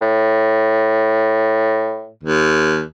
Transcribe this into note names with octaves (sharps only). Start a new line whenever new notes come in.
A2
D#2